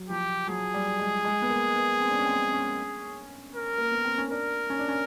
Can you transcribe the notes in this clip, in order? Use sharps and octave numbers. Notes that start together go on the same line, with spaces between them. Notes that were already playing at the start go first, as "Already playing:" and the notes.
Already playing: F#3
F3 G4
F#3 G#4
G3
G#3
G#3
B3
A#3
B3
C4
D4
C#4
C4
C#4
A#4
A#3
B3
C4
C#4
D4 A#4
C#4
D4
C#4